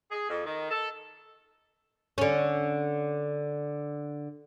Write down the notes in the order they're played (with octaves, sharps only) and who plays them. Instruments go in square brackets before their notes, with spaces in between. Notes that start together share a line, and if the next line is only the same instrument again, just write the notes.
[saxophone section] G#4
F2
D#3
A4
[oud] D3 C#4